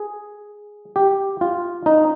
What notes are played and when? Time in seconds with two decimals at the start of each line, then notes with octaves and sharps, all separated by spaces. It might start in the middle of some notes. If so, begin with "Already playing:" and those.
Already playing: G#4
0.96 G4
1.41 F4
1.86 D#4